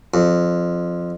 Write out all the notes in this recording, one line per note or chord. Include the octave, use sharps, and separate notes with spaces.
F2